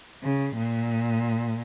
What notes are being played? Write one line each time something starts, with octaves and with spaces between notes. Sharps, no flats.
C#3
A#2